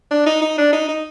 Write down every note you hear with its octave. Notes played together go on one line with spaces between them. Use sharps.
D4
D#4
D#4
D4
D#4
D#4